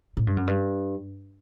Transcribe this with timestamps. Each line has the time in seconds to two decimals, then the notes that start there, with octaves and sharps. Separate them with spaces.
0.17 A2
0.27 G2
0.37 F#2
0.47 G2